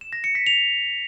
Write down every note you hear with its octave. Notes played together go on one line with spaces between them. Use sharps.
E7
A#6
C#7
B6
F7